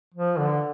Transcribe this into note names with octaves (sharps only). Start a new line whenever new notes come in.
F3
D3